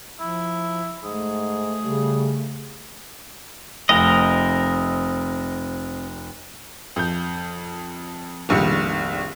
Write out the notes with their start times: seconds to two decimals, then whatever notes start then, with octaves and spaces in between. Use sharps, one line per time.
0.20 F3 E4
1.04 G#2 A3 G#4
1.83 C#3 G3
3.89 F1 C4 A#4 D#5
6.96 F2 G6
8.49 F1 A#1 D#3 G3 C#7